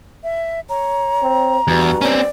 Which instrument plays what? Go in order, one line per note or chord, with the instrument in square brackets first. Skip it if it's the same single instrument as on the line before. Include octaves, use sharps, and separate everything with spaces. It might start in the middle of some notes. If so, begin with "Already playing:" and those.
[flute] E5
[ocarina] C#5 [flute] A#5
[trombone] C4
[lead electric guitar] E2 [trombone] G2 [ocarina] F#4
[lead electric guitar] C4 C#4 [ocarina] D5